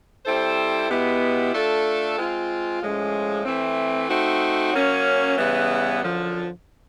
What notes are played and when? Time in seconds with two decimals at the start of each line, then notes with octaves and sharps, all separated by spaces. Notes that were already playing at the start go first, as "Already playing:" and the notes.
0.25 G3 C4 E4 A4 C5
0.89 B2 G#3 B3 E4 G4
1.53 A3 D4 F4 A4
2.17 G#3 C4 F4
2.82 A2 F3 G#3 C#4
3.45 E3 A3 C4
4.09 A3 C4 D#4 F#4
4.73 F#3 A#3 C#4
5.38 C#3 E3 G3 B3
6.01 F#2 D3 F3